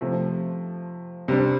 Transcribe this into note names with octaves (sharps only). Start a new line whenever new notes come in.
C3 F3 A3
C3 G3 D4